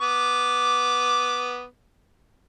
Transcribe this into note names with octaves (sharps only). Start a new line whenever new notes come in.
B3 D6